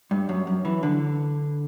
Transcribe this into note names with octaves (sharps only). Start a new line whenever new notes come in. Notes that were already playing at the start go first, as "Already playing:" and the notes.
G2
F#2
F#2
E3
D3